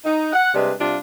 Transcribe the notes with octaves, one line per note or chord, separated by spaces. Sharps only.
D#4
F#5
C3 G3 G#3 D4 B4
C3 G3 D4 F4